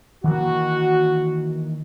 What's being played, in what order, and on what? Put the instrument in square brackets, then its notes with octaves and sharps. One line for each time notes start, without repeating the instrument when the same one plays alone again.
[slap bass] D#3 E3 A#3 [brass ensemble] F#4